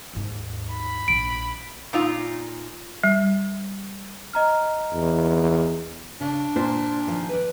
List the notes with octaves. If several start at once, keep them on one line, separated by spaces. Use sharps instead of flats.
D#2 G#2
B5
A#1 D#3 D7
A#2 D#4 F4
G3
D#5 A#5 F6
E2
C#3 D4
A#2 C5
D#3 F3
B4 D5